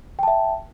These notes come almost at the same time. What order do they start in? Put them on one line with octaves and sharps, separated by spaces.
G5 A5 E5